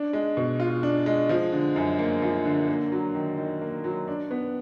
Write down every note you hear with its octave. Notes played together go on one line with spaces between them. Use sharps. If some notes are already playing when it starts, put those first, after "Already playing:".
Already playing: D4
G#3
B2
F4
D4
G#3
F3
D3
F#2
A#3
F3
D3
A#3
F#3
D#3
D#3
A#3
F#3
D4
B3